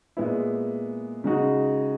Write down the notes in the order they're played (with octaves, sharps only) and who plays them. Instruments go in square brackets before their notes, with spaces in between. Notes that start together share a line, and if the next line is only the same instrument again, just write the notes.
[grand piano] A#2 G#3 B3 E4
C#3 G#3 D#4 F#4